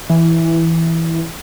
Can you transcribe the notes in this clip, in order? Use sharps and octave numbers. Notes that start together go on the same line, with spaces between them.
E3